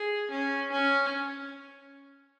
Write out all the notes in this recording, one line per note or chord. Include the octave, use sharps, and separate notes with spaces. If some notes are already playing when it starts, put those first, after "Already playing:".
Already playing: G#4
C#4
C#4